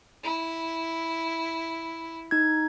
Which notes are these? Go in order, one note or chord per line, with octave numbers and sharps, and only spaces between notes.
E4
D#4 G#6